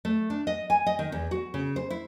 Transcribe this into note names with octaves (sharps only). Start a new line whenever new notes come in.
A3
D4
D#5
G#5
D#5
D#3
E2
F#4
C#3
C5
E4